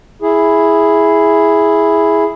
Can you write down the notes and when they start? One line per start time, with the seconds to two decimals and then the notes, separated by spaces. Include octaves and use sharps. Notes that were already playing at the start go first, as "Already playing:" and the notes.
0.22 E4 G#4